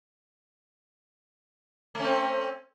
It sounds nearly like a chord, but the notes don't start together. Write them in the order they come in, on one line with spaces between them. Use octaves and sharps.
A3 C#4 C4